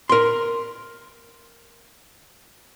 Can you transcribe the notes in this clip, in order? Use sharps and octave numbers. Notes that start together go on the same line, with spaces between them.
A#4 C6